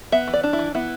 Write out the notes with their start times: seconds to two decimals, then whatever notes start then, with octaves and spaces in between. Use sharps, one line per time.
0.12 B3 E5
0.28 E3
0.33 D5
0.43 D4
0.53 E4
0.59 E3
0.75 B3 E4